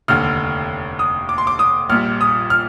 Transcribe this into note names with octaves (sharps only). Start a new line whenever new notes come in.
F1 D#2 D3 F6
D#6
D6
C6
D6
D#6
A#1 A#2 G3 F6
D#6
F6